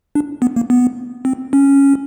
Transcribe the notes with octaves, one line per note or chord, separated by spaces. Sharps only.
D4
B3
A#3
B3
C4
C#4